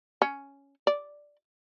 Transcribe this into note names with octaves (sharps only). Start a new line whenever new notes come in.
C#4
D5